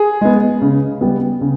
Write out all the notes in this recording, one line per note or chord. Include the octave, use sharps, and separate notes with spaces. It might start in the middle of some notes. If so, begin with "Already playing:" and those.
Already playing: G#4
G#3 B3
C#3
G3 B3
C#3